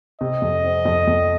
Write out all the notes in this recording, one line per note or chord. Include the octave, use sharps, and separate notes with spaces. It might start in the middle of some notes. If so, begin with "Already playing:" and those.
C3 D#5
F2
C4
F2
F2